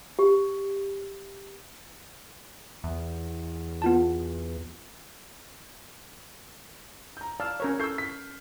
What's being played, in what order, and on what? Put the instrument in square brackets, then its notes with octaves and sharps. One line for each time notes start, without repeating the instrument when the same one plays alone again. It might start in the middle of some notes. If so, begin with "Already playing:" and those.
[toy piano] G4
[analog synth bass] E2
[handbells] B3 F4 A5
[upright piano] A#5 G6
[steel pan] D5 F5 A5 [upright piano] E6 F6
[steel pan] C#4 A#4 C#5
[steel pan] A4 E6 [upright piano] C#6 G6 C7
[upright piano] B6